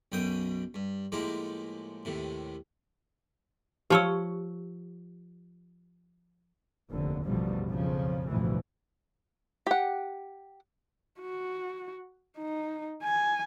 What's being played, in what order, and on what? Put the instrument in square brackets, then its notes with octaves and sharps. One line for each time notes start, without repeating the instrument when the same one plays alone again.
[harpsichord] B1 F#2 B2 G5 D#6
G2
A2 F3 G#3 A#3 G4
D#2 A2 C3
[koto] F3 C#5 [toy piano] G4 C#6 E6
[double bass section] F1 D#2 D3
A1 E2 B2 D3 F3 G3
B1 F2 C#3 F3
A1 D2 G2 B2 E3 F3
[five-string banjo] G4 F#5
[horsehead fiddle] F#4
D#4
G#5